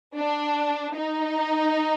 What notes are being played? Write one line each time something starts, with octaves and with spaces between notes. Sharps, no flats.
D4
D#4